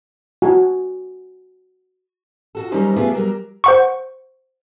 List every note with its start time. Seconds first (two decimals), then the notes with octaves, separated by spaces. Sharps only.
0.42 F#4 G#5
2.55 F4 F#4 A4
2.71 D#2 F#3 G3 C#4 D#4 C5
2.96 A3 B3 F4 G4 G#4 B4
3.13 F#3 G3 A#4
3.64 C5 F#5 C#6